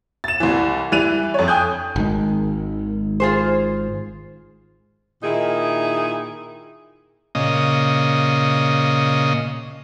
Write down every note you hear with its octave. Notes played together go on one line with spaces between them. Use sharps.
A6 E7
C2 E3
E3 G3 F#6 D#7 F7
F2 C#5
G5 G#5 D#6 F#6 G6
G#1 D#3 G#3
F4 G#4 C5
A#2 D#3 D#4 E4 G#4
A#2 C#3 D#5